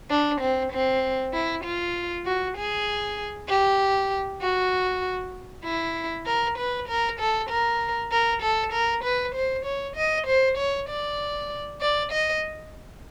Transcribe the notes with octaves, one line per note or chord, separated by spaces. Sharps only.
D4
C4
C4
E4
F4
F#4
G#4
G4
F#4
E4
A#4
B4
A#4
A4
A#4
A#4
A4
A#4
B4
C5
C#5
D#5
C5
C#5
D5
D5
D#5